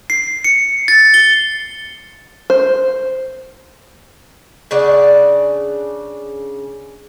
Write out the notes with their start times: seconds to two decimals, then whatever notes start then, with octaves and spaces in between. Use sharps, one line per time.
0.10 C7
0.44 C#7
0.88 A6
1.14 G7
2.50 C5
4.71 C#3 D4 D5 F#5